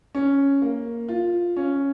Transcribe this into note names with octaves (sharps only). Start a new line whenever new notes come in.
C#4
A#3
F4
C#4